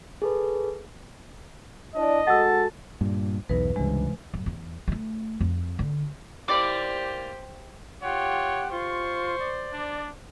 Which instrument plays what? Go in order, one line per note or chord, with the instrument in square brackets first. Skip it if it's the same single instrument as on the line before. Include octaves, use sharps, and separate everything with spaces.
[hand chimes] G#4 A4 B4
[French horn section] D4 E4 D5 [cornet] D#5
[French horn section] G#3 F#4 A4 [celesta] F#5 E6 [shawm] A5
[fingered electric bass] G2 A#2
[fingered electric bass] B1 E2 [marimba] G2 D#4 B4
[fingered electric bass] C#2 G2 [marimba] C3 E3 G#3
[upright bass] F#2
E2
G#3 A3
F2
D3
[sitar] A#3 E4 D5 [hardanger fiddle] G4 C5 [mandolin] D6
[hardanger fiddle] F4 G4 [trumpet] C#5 [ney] F#5
[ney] F4 [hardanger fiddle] C5 [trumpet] C#6
[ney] D5
[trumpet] D4